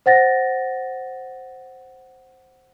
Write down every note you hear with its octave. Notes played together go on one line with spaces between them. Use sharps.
C5 F#5 A6 A#6